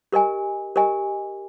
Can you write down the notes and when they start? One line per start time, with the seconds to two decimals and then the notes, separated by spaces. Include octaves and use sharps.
0.12 G4 A#4 D#5 G#5
0.76 G4 A#4 D#5 G#5